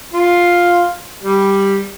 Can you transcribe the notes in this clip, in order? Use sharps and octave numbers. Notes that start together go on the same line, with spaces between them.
F4
G3